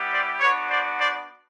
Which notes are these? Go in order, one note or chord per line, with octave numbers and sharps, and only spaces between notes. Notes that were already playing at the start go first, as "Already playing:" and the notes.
Already playing: G3 B3 E4 G4
C5 D5
B3 D4 F#4 B4 C#5
C5 D5
C5 D5